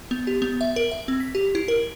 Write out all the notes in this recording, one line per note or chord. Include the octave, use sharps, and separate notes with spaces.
B3
G4
B3
E5
A#4
E5
C4
B6
G4
E4
A#4